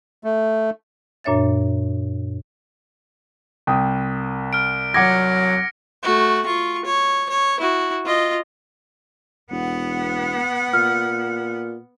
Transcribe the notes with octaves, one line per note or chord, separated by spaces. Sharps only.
A3
F#2 A#2 D4 C#5 E5 A6
C2 G5 D#6
F6 D7
F#3 F#5 D6 G#6 A#6 C#7
A3 F#4
F4 C#6
C#5
C#5
E4 F#4
F4 D#5
E1 B3 F#5
A#2 F6